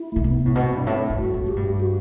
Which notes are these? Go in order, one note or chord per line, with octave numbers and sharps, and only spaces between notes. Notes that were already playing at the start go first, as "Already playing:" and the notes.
Already playing: E4
B2 A3
C3 B3
A2
B2 C4
G2
A2
G2
F#4
A2
A2 G4
G2
F#4